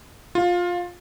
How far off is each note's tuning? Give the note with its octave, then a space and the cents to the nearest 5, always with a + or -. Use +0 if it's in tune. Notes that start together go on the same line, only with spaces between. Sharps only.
F4 +15